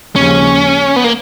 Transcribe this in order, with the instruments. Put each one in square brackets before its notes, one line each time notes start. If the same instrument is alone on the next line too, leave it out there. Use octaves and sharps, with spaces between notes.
[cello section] D#2 C#3 F3 G#3 [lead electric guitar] C#4
[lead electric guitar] B3
A#3